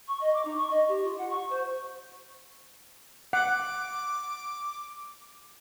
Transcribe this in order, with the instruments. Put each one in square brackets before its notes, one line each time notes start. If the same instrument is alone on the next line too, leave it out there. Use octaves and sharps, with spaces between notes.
[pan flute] C#6
D#5
D6
D#4
C#6
D#5
G4
F4
F#5
C#6
C5
[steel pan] F#5 [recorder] D6